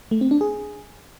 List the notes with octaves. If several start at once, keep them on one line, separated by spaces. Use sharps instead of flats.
A3
C4
D4
G#4